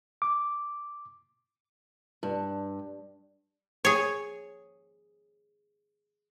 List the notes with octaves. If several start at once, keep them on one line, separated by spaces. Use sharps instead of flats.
D6
G2
G#4 C#5